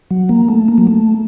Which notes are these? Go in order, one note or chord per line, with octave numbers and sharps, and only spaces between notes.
F#3
A#3
A3
A#3
F#3
A3